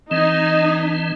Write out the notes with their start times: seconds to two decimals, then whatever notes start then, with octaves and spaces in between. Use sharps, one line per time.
0.11 E3 C4 D#4 D#5